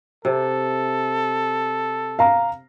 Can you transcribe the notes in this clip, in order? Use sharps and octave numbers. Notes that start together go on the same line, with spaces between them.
C3 A4
F5 A#5